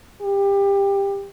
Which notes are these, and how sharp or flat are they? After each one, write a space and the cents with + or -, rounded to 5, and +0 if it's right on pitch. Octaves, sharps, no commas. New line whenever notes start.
G4 +20